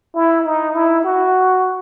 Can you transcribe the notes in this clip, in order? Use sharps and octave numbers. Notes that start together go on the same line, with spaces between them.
E4
D#4
E4
F#4